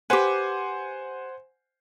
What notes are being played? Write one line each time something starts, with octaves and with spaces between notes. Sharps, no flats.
G4 B4 C5 F#5 G#5